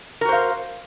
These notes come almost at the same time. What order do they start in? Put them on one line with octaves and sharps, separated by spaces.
A#4 F#4 C5 F5